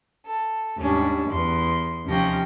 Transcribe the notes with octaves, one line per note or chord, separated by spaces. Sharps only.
A4
D#2 G#2 G3 C#4 D4
E2 C6
D#2 C3 F3 C#4 G5 A#6